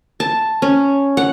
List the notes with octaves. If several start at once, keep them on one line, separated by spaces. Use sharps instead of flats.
A5
C#4
F#5